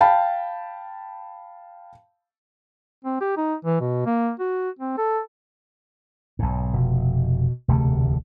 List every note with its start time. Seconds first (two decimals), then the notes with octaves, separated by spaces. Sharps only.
0.01 F5 G5 A5 B5
3.05 C4
3.21 G4
3.37 D#4
3.65 E3
3.80 B2
4.06 A#3
4.39 F#4
4.79 C4
4.98 A4
6.39 B1 G#2
6.73 F1 B2
7.68 E1 D2 C3 A3